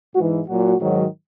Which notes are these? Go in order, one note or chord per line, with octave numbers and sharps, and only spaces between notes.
G#2 E3 F#4
A#2 F#3 F#4
G#2 D#3 F#3